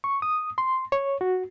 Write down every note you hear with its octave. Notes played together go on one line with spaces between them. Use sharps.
C#6
D#6
C6
C#5
F#4